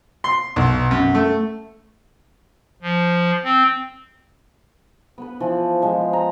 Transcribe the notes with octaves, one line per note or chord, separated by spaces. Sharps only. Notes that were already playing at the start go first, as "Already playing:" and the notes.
C6
B1
F#2
A3
F3
C4
B3 B4
E3 F3
F3 G#3
A#5